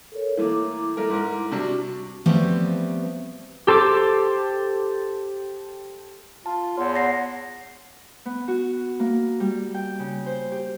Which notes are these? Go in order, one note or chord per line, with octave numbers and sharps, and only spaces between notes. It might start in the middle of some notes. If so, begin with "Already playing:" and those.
A4 A#4 C#5
E3 A3 A#3 E4 A#5 D6
A3 A#4
G#2 A#4
C3 G3 D4 F#4 C#6
F3 G3 A3 B3 C4
G4 A4 C5 D6
F4 A5
E2 C#5 C6
F#5 A#6 C7
B3
F#4
A#3
G3
G5
C#3
C5
G4